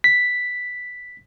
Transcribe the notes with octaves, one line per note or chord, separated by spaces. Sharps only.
B6